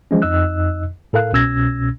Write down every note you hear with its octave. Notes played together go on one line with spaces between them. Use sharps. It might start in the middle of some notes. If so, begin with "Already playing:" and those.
E3 F3 G#3 C#4
F2 D#4 D#5 E6 F#6
A2 A4 A#4 F5 F#6
C2 B2 C#4 E6 G#6 A#6